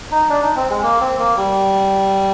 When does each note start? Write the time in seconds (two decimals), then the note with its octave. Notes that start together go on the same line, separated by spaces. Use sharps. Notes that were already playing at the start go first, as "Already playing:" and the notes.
0.12 D#4
0.29 D4
0.43 D#4
0.56 C4
0.70 G#3
0.83 A#3
1.01 C4
1.19 A#3
1.37 G3